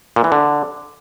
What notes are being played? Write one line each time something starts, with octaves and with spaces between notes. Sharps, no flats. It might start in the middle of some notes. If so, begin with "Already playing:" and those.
A#2
E3
D3